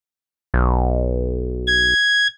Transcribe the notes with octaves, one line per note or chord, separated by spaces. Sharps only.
B1
G#6